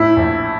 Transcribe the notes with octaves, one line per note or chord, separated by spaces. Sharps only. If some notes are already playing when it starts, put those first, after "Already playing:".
Already playing: A2 E4
A#1